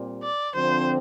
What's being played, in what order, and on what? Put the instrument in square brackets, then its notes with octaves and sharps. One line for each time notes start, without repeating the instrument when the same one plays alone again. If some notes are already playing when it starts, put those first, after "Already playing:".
Already playing: [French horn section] A#2 G3 C4
[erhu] D5
[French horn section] D3 F3 C4 [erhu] C5